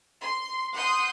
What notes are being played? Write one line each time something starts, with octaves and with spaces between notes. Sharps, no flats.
C6
F#5 C6 D#6 G6